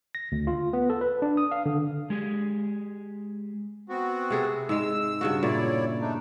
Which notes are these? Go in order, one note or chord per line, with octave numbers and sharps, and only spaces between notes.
A#6
D2
F4
B3
A4
B4
D4
D#6
F5
D3
G#3 G4 G#4
B3 C4 F#4
C3 G#4 A4
G#2 G#3 E6
G2 C#3 F#4
A#2 E4 C#5 D5
A3 D4 D#4